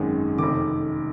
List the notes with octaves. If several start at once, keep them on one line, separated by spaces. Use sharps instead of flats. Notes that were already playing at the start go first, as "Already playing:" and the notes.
Already playing: G#1 F#2 D#3 G#3
F1 F2 D#3 D6